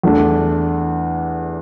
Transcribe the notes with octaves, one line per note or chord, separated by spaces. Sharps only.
E2 E3 A3 D4